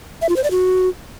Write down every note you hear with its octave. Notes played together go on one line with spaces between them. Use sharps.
E5
F4
C5
D5
F#4